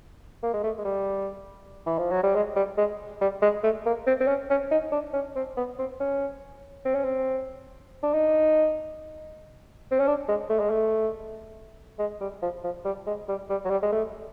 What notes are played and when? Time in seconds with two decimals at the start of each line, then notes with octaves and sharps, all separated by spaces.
0.43 A#3
0.54 G#3
0.64 A3
0.78 G#3
0.85 G3
1.86 E3
1.99 F3
2.11 F#3
2.23 G3
2.35 G#3
2.56 G3
2.78 G#3
3.21 G3
3.42 G#3
3.64 A3
3.86 A#3
4.07 C4
4.20 C4
4.28 C#4
4.50 C#4
4.71 D#4
4.92 D4
5.14 C#4
5.36 C4
5.57 B3
5.79 C4
6.00 C#4
6.85 C4
6.95 C#4
7.04 C4
8.03 D4
8.14 D#4
9.91 C4
9.99 C#4
10.07 D4
10.28 G#3
10.50 A3
10.60 G#3
10.70 A3
11.99 G#3
12.21 G3
12.42 F3
12.64 F3
12.85 G3
13.07 G#3
13.29 G3
13.50 G3
13.65 F#3
13.70 G3
13.83 G#3
13.92 A3